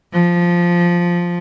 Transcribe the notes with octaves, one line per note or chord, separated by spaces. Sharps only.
F3